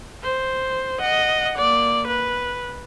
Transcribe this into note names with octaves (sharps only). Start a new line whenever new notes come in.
C5
D#5 F#5
A#3 D5
B4